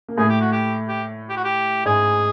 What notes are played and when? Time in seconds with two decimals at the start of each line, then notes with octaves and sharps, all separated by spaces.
0.08 A#3
0.18 A2 A3 G#4
0.29 G4
0.41 F#4
0.52 G4
0.89 G4
1.30 G4
1.37 F#4
1.44 G4
1.85 G#2 G#3 G#4